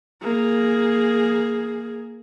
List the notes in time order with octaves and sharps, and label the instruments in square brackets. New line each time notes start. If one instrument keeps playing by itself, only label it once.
[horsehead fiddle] A#3 G#4